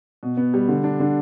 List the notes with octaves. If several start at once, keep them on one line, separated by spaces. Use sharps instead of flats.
B2
B3
G3
D3
D4
D3